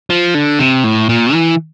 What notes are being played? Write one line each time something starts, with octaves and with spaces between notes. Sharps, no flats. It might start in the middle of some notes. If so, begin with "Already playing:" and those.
F3
D3
C3
A2
A#2
E3